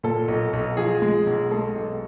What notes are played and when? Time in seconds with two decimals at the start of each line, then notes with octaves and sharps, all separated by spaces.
0.04 A#2 A4
0.28 B1
0.53 B1
0.77 F3 G#4
1.02 G#3
1.27 B1
1.51 G#3 A4
1.75 B1